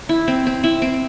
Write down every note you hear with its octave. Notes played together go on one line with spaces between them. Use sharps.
E4
C4
C4
E4
C4